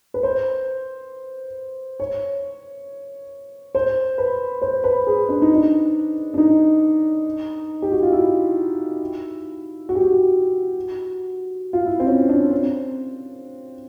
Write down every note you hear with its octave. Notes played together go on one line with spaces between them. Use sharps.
B4
C5
C#5
C5
B4
C5
B4
G#4
D4
D#4
D4
D4
D#4
G4
F#4
F4
E4
F#4
G4
F#4
F4
E4
C4
C#4
D4
C4